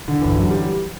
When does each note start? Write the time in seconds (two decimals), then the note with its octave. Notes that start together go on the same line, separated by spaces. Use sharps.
0.08 E2 D3
0.21 G2 E3
0.35 F#2 F#3
0.50 G3